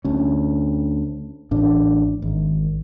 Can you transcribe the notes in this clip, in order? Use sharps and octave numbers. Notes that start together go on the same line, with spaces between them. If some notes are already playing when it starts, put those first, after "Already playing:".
D2 C#4
A1 A2 D4
G#1